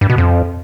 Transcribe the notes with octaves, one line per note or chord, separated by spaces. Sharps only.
G2
B2
F2